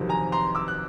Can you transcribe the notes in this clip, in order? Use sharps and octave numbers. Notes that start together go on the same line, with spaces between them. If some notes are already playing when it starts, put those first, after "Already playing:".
Already playing: G1 F2 C3 D#3 F#3
G#5 A#5
A#5 C6
D6 E6
F#6